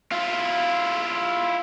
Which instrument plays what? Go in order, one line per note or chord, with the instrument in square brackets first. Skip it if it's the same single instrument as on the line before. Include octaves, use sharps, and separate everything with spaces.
[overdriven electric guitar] E4 F4